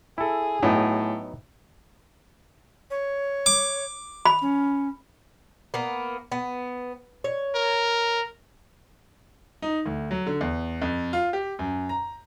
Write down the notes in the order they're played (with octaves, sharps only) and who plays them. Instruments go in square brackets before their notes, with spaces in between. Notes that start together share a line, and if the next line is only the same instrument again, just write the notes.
[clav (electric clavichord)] E4 A4 [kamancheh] G#4
[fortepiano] A2 [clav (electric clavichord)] F#3 B3 D#4
[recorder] C#5
[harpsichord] D6
[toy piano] B5
[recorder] C#4
[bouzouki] A#3 B3
B3
C#5
[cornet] A#4
[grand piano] D#4
D2
F#3
D3
E2
F2
F4
G4
F#2
A#5